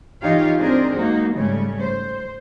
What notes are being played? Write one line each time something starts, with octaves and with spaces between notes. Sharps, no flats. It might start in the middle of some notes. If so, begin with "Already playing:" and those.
E3 D#4 F4 G4 C#5 F5
C4 D4 G#4 A#4 C5
G#3 A#3 D#4 F#4
G#2 C#3 G3 A3 C#4
C5